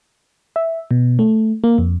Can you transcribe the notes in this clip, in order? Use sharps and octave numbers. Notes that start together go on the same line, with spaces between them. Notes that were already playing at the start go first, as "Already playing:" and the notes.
E5
B2
A3
A#3
F2